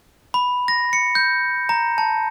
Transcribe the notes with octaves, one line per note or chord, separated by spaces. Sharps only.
B5
A#6
C#7
G6
A#5
A5